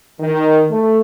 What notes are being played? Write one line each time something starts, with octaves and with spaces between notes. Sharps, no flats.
D#3
A3